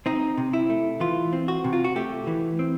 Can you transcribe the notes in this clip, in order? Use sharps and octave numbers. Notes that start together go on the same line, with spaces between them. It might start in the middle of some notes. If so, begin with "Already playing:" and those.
C4 D#4
C3
E4
A3
E3 F4
C4
F#4
C3
F4
F#4
A3 G4
E3
C4